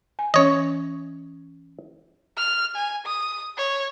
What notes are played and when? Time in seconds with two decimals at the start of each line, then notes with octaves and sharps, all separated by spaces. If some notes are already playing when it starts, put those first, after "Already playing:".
0.19 G#5
0.34 E3 C#4 C#5 D#5
2.37 F6
2.76 G#5
3.06 D#6
3.57 C#5